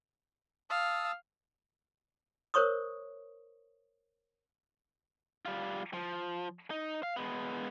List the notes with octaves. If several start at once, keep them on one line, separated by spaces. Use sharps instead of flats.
F5 A5 D#6 E6
A#4 C5 C#5 C#6 D#6
G3 F4
F3
D#4
F5
G#3 B3